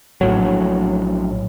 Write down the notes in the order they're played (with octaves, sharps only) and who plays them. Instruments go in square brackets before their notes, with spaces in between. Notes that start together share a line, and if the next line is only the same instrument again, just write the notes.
[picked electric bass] A#1 A2 F#3